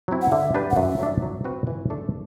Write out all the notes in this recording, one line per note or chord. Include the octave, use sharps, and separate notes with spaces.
F#3 C4 E4
F#5
D3 E5
G3 D4 G4 B4
F#5
F#2 E5
F#3 A3 D4
F#3
C4 F#4 B4
E3
A3 D4 A4